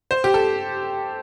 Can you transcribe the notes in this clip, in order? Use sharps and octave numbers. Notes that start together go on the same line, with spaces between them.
C5
G4
A4